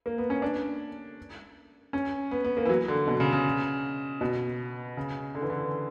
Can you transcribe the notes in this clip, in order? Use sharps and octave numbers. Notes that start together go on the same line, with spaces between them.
A#3
B3
C#4
D4
C#4
B3
B3
A#3
E3
F#3
D3
B2
C#3
C#3
B2
C#3
D3
E3
D3